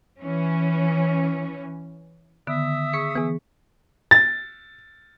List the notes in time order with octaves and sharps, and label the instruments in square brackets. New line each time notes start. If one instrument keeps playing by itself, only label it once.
[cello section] E3 C#4
[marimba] D3 D#3 B3 [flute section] E5 D#6 E6
[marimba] G#4 [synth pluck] C#6 B6 C#7
[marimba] E3 [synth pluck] B3 G#4
[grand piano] A6